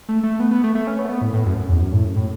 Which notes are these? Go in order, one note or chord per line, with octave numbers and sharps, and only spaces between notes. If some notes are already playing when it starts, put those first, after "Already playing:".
A3
A3
B3
B3
A3
A3
C#4
B3
A3
B3
A2
A2
F#2
F#2
E2
F#2
A2
F#2
A2